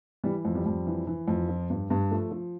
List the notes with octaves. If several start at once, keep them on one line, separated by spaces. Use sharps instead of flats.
E3 G3
F2
G3
F2
E3
E3
F2
F3
G2
G2
F3 A3
F3